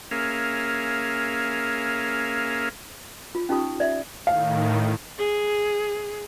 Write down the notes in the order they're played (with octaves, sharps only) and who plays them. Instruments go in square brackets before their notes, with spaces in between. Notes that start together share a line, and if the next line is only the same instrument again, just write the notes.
[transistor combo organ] A#3 C#4 G#4 A#4 E5 F5
[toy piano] F4
C#4 D#4 F4 G4 D#6
D5 E5
[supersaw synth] A2 D#3 [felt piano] F5
[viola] G#4